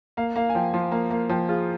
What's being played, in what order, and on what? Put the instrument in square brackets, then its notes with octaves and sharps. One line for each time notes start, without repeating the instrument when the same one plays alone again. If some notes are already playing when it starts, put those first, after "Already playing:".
[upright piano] A#3 [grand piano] F5
[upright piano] A#3 [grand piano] F5
[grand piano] G#5
[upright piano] F3 [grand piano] G5
[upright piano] F3
[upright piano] A#3 [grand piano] F5
[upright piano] A#3 [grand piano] F5
[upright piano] F3 [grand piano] G5
[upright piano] F4 [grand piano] G#4